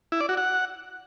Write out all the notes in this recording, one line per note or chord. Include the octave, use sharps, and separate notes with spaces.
E4
D5
F#4
F#5